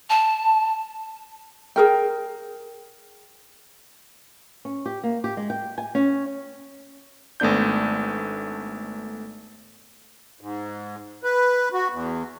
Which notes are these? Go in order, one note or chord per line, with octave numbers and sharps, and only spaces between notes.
A5
G#4 A#4 G5
C#4
G4
A#3
G4
G#3
G5
G#5
C#4
G#1 A3 B3 D4 G6
G#2
B4
F#4
E2